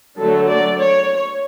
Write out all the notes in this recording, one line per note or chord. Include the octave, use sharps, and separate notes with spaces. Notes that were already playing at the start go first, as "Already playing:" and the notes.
D3 F#3 A3 A4
D5
C#5